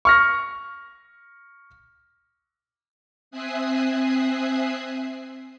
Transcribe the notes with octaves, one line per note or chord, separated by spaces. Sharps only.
C#6 F6 A#6
C4 E5 G#5 D#6 F#6 C7